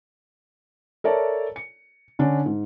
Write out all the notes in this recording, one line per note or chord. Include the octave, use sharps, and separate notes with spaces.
A4 A#4 C#5 D5 E5 A5
C#7
D3 C#4 D4
G#2